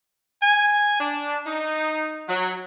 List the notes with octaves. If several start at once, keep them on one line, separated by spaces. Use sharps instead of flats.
G#5
D4
D#4
F#3